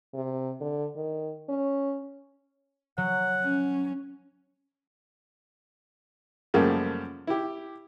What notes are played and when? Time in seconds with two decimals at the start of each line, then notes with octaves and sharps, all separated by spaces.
0.14 C3
0.61 D3
0.96 D#3
1.49 C#4
2.98 F#3 F#5
3.44 C#4
6.54 F#2 C#3 F3 G3 A3 A#3
7.27 E4 G4